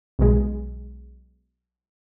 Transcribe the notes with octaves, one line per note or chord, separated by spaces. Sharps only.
B1 B2 G#3